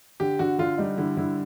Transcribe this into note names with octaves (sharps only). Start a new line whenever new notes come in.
D3 G4
D3 F#4
D3 F4
G3 D#4
D3 E4
D3 E4